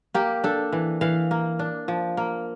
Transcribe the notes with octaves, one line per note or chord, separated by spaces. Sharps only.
A#3 G4
D4 A4
E3
E3 F5
A#3
D4
F3
A#3